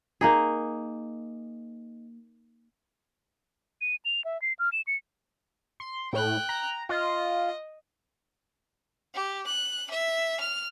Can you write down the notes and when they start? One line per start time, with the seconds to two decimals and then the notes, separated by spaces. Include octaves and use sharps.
0.21 A#3 D#4 G#4
3.81 D#7
4.05 F7
4.25 E5
4.42 C7
4.59 F6
4.73 E7
4.87 C#7
5.80 C6
6.13 A2 G5 F#6
6.49 A#5
6.89 F4 D#5
9.14 G4
9.46 F#6
9.90 E5
10.40 F6